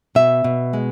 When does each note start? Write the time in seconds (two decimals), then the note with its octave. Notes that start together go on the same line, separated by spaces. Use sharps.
0.15 B2 E5
0.44 B2
0.73 G#3